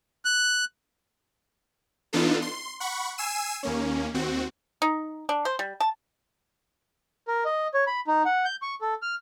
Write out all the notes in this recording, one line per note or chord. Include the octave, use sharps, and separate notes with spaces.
F#6
E3 B3 D4 D#4 F4 A4
C6
F#5 B5 C#6
G#5 E6 C7 D#7 E7
D#2 A#3 C#4
D#2 C4 F#4
D#4
D4
C5
G3
A5
A#4
D#5
C#5
B5
D#4
F#5
G6
C#6
A4
F6